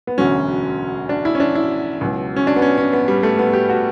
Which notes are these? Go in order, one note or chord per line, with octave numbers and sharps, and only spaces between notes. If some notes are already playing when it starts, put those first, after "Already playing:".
B3
E1 D2 D3 F#3 C#4
D4
E4
C#4
D4
E4
C#2 B2 F#3
C#4
D4
B3
C#4
C#4
B3
G3
A3
B3
G4
F#4